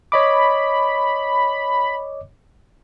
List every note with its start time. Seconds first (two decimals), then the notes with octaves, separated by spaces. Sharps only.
0.12 C#5 D#5 B5 D6